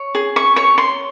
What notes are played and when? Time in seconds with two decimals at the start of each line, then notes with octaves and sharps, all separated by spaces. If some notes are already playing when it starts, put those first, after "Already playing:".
Already playing: C#5
0.15 G#4
0.36 C#6
0.56 C#5 C#6
0.78 C6